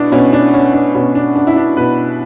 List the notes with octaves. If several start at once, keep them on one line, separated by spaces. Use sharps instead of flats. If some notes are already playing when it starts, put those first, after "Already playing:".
Already playing: B2 D4 E4
B2 C#4
D4
C#4
D4
B2 C#4
D4
D4
E4
D4
B2 B4